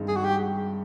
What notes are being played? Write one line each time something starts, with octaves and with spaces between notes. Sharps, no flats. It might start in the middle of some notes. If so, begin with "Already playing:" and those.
Already playing: G2 D#3 G#3 C4 D#4
G#4
F#4
G4